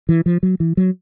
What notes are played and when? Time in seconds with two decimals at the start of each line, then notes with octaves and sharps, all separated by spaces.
0.09 E3
0.26 F3
0.43 F#3
0.60 E3
0.77 F#3